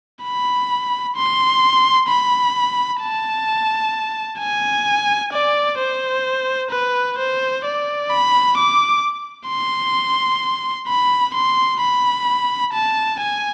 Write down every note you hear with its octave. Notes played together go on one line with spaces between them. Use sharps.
B5
C6
B5
A5
G#5
D5
C5
B4
C5
D5
B5
D6
C6
B5
C6
B5
A5
G#5